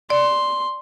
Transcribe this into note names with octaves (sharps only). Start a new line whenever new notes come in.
D5 C6